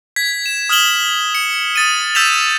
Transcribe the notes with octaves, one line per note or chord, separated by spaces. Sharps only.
G#6 B6
E7
D#6 F6 E7 F#7 G7
C#7
D#6 A6 D#7
E6 G6 A6 B6 E7 F7